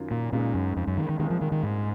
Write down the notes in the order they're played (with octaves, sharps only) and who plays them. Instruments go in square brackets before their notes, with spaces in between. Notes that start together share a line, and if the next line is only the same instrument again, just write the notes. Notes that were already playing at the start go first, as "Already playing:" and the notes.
Already playing: [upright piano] F#2 D#3 F#3 C#4 F4
[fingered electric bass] A#2
[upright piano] C#2 C#3 G#3 D#4 [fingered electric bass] A#2
[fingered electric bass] F#2
F2
F#2
D#3
D#3
[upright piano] C2 A#2 G#3 [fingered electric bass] D#3
[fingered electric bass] F3
D#3
D#3
G#2